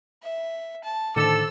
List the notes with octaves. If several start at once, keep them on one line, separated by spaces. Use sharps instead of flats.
E5
A5
A2 D3 D#3 A4 C5 D6 E6